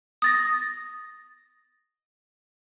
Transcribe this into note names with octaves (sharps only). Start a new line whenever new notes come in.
D#6 A6 A#6